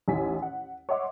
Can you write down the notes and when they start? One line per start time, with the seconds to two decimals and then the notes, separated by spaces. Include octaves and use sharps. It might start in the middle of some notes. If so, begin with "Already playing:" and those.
0.08 A1 D#2 E4 G#5 B6
0.42 F#5
0.89 C#5 D#5 E5 F#5 C6 D6